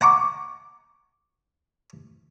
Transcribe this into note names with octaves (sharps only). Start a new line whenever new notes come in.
F#5 A#5 C#6 D6